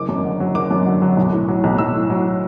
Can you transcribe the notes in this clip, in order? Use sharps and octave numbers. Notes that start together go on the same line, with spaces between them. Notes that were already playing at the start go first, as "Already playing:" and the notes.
Already playing: F#1 D6
F#2
D3
F#3
F#1 D6
F#2
D3
F#3
B1
A2
F#3
B1
B1 E6
A2
F#3